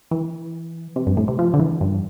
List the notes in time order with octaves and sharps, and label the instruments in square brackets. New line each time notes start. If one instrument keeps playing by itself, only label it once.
[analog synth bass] E3
C3
G2
A2
C3
F3
D3
E3
G2